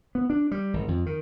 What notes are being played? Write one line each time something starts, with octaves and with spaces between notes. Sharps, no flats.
B3
D4
G3
G#1
F2
D#3